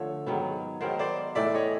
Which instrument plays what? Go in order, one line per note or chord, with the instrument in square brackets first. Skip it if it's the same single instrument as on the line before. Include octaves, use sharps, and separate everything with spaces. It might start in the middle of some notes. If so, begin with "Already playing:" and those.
Already playing: [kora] D3 F3 A3 [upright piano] C#5
[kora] G#2 D#3 F#3 B3
[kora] G#2 D#3 F#3 B3 [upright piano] A#4 C5
[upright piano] C5 D5
[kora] A2 E3 A3 [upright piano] D5 E5
[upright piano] C#5 D#5